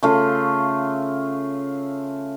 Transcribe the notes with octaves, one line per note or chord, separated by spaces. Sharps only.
C#3 A3 F4